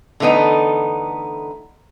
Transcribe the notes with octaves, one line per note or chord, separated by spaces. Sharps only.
D3 E3 A3 B3 D#4